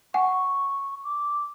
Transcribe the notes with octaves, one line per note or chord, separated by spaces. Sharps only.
F#5 G#5 C#6
D6